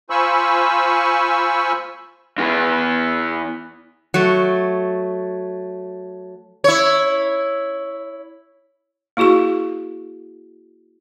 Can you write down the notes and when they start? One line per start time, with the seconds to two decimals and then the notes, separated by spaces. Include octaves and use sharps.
0.10 F4 C5 G#5 B5 C#6 E6
2.38 E2 B3
4.14 F#3 A3
6.64 E4 C#5
9.17 A#3 E4 F#4 G#4 C#6